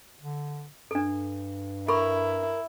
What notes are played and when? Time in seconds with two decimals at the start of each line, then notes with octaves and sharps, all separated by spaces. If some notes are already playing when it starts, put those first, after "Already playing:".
0.21 D3
0.91 G2 D4 A4
1.88 E4 A4 A#4 B5 C#6